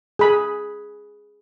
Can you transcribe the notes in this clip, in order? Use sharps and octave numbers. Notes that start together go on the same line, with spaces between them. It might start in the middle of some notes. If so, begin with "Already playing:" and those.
G#4 B5